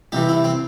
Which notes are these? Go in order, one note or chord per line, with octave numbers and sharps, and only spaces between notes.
C2 C3 E3 G4
E4
C4